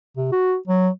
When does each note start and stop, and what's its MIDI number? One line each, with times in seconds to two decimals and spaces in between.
0.17 0.28 48
0.32 0.56 66
0.68 0.89 54